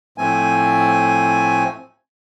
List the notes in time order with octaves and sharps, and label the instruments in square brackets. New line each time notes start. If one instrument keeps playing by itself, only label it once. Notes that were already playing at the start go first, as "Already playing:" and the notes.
[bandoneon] A2 F3 A3 C4 G#5